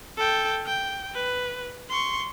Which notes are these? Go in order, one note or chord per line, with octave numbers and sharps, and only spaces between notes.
A4 G5
G5
B4
C6 C#6